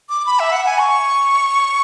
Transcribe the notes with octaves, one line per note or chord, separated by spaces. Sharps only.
D6
B5
E5
F#5
G#5
C#6